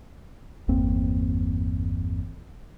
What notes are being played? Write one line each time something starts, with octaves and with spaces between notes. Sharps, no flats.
G1 E2 A#3 C4